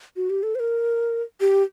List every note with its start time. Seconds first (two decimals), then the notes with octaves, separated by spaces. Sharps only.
0.16 F#4
0.30 G4
0.43 A4
0.55 C5
0.60 A#4
1.41 G4